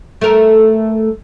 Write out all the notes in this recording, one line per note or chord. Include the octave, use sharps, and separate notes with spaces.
A3 A#4